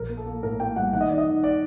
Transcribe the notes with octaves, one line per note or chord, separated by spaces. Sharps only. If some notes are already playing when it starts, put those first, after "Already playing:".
Already playing: A#1 A#4
A#3
A4
A#3
A2 A#4
A#3 G5
G3 F#5
D#3 F#5
D#5
D#3 D5
D#5
D#3
D5